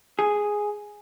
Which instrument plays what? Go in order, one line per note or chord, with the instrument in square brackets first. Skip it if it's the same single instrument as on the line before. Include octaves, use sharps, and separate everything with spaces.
[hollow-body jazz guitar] G#4